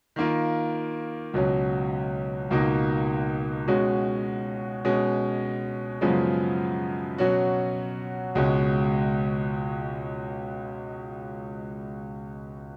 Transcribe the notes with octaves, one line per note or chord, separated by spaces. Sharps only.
D#3 A#3 F4
C#2 B2 F#3 C#4
C#2 B2 A#3 D#4
B2 G#3 C#4 F#4
B2 G#3 C#4
F#2 C#3 F3 G#3 B3
B2 F#3 C#4 F#4
C#2 B2 G#3 C#4